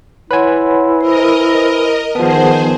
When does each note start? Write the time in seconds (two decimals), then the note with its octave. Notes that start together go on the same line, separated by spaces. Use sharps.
0.31 E4 B4 C#5 F#5 G#5 C6
1.01 A#4 C5 D#5
2.15 D#3 F3 B3 G#4 A#4 C5 F#5 A5